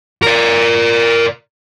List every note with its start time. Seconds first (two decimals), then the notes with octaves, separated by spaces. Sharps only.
0.22 A#4 D5